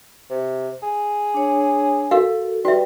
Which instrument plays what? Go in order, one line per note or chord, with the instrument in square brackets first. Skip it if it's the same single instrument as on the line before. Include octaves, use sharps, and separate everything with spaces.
[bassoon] C3
G#4
[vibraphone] D4 C#5
[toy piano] F#4 A#4 F5 [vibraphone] A4
[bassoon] G3 [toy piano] F#4 E5 [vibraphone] B4 G5